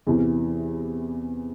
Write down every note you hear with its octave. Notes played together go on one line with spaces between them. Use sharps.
E2 C3 E3